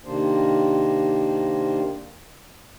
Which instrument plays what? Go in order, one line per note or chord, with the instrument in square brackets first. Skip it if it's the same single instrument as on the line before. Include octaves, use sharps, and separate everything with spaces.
[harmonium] C3 D#3 A#3 D4 C5